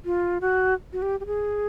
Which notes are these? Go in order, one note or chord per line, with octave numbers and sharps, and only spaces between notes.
F4
F#4
F#4
G4
G4
G#4